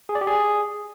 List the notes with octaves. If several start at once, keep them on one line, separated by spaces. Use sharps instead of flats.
G#4
D5
G4
G#4